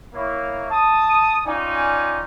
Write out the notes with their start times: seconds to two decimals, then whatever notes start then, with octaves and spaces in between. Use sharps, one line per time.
0.14 A#3 E4 C#5
0.71 A5 D#6
1.46 C#4 D#4 F4 D5 G5 G#5